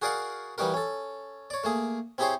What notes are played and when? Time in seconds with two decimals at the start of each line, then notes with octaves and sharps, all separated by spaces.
0.02 F#4 G#4 A#4 D5 F5 F#5
0.58 E3 G3 D#4 F#4 A#4
0.74 C#4 A4
1.50 C#5 D5
1.64 A3 A#3 G#4
2.18 C4 E4 G4 G#4 C5 C#5